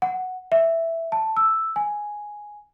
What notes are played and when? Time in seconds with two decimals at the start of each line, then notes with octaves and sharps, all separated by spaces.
0.02 F#5
0.52 E5
1.12 A5
1.37 E6
1.76 G#5